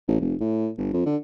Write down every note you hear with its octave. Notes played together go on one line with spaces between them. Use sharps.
A1
F1
A2
G1
F2
D3